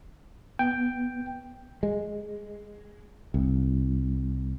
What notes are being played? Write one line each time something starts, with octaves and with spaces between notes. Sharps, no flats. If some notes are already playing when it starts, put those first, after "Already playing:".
B3 G5
G#3
C2